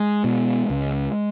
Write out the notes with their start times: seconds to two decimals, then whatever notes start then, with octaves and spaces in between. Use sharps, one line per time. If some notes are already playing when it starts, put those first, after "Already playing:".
Already playing: G#3
0.24 B2
0.70 C#2